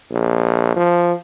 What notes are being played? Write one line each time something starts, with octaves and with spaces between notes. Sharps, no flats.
A#1
F3